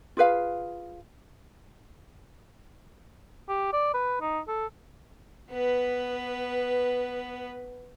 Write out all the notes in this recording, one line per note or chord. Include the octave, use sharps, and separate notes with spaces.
F4 G#4 B4 F5
G4
D5
B4
D#4
A4
B3 B4